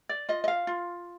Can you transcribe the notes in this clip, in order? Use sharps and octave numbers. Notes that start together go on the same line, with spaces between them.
D5
F4 D#5
D#5
F5
F4